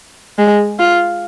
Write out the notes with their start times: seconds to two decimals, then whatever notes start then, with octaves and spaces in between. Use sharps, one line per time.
0.38 G#3
0.79 F4